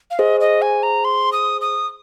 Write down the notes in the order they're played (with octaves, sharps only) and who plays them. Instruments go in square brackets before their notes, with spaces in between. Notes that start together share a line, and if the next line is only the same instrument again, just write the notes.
[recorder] F5
[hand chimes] G#4 C5 [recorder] D#5
[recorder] D#5
G#5
A#5
C6
D#6
D#6